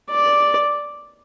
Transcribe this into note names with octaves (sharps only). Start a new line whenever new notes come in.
D5